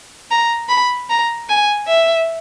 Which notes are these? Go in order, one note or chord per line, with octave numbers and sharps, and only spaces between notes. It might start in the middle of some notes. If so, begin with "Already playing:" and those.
A#5
B5
A#5
G#5
E5